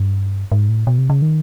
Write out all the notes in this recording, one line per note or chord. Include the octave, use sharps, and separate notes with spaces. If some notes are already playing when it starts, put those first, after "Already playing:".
Already playing: G2
G#2
A2
B2
C3
C#3
D#3